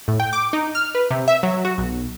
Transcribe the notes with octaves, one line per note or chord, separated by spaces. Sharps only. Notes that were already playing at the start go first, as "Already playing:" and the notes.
A2
G5
D6
D#4
F6
B4
C3
E5
F#3
F#4
B1